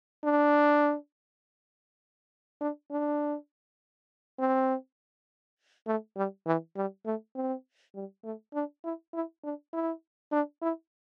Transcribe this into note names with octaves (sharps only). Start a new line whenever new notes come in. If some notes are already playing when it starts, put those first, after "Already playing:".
D4
D4
D4
C4
A3
G3
E3
G3
A3
C4
G3
A3
D4
E4
E4
D4
E4
D4
E4